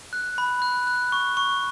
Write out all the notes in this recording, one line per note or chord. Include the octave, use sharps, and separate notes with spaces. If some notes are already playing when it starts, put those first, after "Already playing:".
F#6
B5
F#6
F#6
C#6
C#6